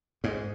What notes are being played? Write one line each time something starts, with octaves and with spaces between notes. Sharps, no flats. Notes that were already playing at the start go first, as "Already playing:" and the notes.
G#2